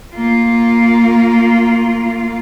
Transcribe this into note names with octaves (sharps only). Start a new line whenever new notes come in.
A#3 F4